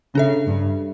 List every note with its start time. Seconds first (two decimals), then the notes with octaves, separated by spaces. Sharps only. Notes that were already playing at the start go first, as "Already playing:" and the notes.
0.15 C#3 D4 A4 E5
0.47 G2